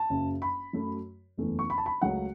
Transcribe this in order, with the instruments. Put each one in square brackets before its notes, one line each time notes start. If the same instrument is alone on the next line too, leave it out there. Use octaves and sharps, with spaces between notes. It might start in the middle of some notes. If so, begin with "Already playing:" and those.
Already playing: [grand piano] A5
F#1 F#2 C#3
B5
F#2 F#3 A3
F#1 E2 E3 A3
C#6
B5
A5
B5
C#2 C#3 F#3 A3 F#5